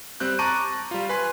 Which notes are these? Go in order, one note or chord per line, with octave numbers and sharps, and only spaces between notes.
G3 C4 F#6 G6
A5 A#5 C#6 D6 F#6 D#7
G3 F4
B4 G#5 C6